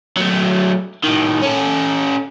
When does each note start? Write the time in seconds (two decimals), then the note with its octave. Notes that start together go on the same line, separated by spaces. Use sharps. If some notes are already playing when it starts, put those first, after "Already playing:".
0.17 F#3 A3
1.04 A2 D#3
1.42 C#4 A4